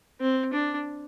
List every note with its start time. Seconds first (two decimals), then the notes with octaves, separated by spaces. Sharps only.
0.21 C4
0.53 D4